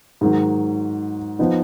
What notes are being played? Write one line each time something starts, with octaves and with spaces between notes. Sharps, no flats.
G#2 D#3 F#3
F3 B3 D#4